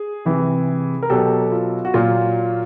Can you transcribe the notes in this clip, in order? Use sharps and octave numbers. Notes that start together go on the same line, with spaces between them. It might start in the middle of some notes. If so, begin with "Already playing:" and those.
Already playing: G#4
C3 E3
A#4
B2 F#3 G4 A4
F4
F#4
A#2 F#3 F4